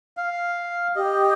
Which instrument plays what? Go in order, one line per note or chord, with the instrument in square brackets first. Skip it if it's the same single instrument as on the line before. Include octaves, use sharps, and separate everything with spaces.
[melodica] F5
[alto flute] G4 [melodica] D#5